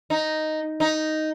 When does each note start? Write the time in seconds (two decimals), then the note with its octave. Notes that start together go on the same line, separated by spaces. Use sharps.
0.10 D#4
0.80 D#4